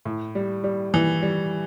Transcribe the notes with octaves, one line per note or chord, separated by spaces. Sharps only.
A2
G3
G3
E3
G3